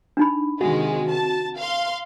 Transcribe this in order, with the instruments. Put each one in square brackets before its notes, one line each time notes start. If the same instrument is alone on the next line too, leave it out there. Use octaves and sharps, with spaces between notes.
[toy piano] D4 D#4 B5
[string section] C3 D#3 G#3 [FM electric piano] F#4
[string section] A5
F5 C6